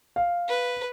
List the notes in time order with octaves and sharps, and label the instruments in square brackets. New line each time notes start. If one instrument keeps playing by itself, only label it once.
[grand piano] F5
[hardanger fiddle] B4